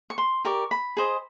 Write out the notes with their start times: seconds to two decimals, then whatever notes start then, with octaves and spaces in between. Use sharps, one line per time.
0.10 C#6
0.18 C6
0.45 G4 A#4 D5 C#6
0.71 B5
0.97 G#4 C5 D#5